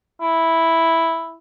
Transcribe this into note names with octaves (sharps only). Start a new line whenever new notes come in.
E4